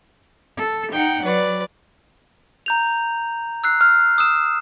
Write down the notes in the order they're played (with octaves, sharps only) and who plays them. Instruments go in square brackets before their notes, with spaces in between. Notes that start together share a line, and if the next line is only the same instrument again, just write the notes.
[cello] A4
[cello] D#4 F#5 [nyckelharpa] G5
[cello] F#3 [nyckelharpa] B4 D5
[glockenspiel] A#5 G6 F7
E6 F#6 C7
[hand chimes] F6
[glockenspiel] D#6 E6 E7